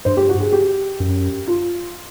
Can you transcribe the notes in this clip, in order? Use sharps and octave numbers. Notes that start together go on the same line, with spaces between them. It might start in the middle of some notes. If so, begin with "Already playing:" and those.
G2 C5
G4
F#4
G#4
G4
F#2
F4